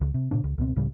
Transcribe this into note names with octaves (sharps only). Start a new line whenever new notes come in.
C#2
C3
A#2 C#3 D4
C#2
C#2 B2 C4
C#2 A2 C#3 G3